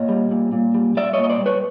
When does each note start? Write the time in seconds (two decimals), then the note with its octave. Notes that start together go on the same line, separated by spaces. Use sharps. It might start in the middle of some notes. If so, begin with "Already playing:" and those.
Already playing: A#2 C#5 D#5
0.09 G3
0.31 A#2
0.53 A#2
0.74 G3
0.97 G3 D5 E5
1.13 C#5 D#5
1.18 A#2
1.24 D#5
1.30 C5 D5
1.40 G3
1.46 B4 C#5